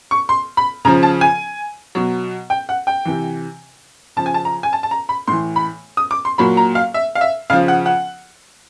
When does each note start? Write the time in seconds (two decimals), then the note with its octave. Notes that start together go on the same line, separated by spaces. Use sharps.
0.11 C#6
0.29 C6
0.57 B5
0.85 C#3 F3 A#5
1.03 A5
1.21 G#5
1.95 B2 F#3
2.50 G5
2.69 F#5
2.87 G5
3.05 C3 E3
4.16 C#3 F3 A5
4.26 G#5
4.34 A5
4.45 A#5
4.63 G#5
4.73 A5
4.83 A5
4.91 A#5
5.09 B5
5.28 A2 E3 C6
5.56 B5
5.97 D#6
6.11 D6
6.25 C6
6.38 A#2 F#3 B5
6.57 A#5
6.75 F5
6.94 E5
7.15 F5
7.21 E5
7.50 C#3 F3 F5
7.68 F#5
7.86 F#5